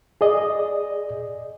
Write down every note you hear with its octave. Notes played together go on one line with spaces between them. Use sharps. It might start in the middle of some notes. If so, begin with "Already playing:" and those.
G#4 D5 D#5